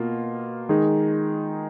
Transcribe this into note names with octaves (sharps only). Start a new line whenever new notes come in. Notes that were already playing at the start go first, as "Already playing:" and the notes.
Already playing: B2 A#3 F4
D#3 G#3 D#4 G#4